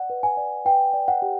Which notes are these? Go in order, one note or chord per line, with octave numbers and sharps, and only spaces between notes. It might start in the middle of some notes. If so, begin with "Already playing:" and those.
Already playing: D5 F#5
B4
G#5
D5
B4 G5
D5
F#5
G4